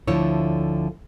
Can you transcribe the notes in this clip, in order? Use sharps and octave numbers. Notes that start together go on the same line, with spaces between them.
D2 D3 F3 A3 E4 C#5